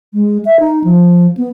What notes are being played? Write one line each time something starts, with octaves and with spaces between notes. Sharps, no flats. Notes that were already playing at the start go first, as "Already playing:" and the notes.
G#3
E5
D#4
F3
B3